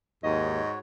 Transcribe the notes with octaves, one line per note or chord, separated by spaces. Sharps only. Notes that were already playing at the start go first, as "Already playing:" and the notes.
D#2 G#2 F#4 C#5 D#5